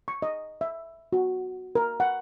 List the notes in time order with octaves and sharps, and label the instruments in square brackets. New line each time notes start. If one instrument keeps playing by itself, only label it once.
[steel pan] C#6
D#5
E5
F#4
A#4
F#5